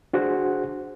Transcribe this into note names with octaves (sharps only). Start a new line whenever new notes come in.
D4 F#4 G#4 C5 F#5